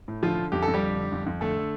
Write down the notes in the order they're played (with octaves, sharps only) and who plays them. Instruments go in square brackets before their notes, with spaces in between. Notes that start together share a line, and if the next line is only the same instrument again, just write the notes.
[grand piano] A2
D3 F3 F4
D3
F2 G4
A4
F2
G3 G4
D3
D3
F2
F2
D3 A3 A4
D3